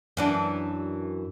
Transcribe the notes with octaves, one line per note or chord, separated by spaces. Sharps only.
F#2 E3 D4